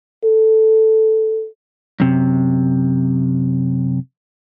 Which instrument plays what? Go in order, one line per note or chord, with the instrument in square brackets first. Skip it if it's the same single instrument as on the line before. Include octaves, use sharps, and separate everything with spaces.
[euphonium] A4
[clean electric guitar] F#2 C3